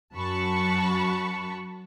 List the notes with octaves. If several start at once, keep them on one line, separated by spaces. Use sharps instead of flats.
F#2 F#4 A5 B5 C#6